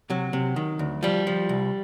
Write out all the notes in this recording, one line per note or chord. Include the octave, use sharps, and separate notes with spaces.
C3 F#3
C3
D#3
D2
F3 G3
F3
C2